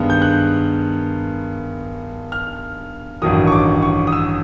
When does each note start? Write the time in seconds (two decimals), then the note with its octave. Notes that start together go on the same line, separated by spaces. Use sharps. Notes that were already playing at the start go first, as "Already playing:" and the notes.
Already playing: G2 D#3 G#3 B3
0.10 G6
0.22 F#6
2.32 F6
3.22 A1 G2 D#3 F#3 D#6
3.47 C#6
3.52 D6
3.82 C#6
4.07 D#6
4.12 E6